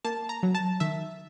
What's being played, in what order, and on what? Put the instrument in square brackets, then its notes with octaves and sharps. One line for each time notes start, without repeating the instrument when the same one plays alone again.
[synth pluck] A#3 A5
A#5
F#3
A5
D#3 E5